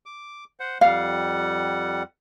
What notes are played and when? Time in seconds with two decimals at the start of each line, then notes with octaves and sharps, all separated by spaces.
0.06 D6
0.60 C5 F#5
0.81 F2 G3 F5 F#5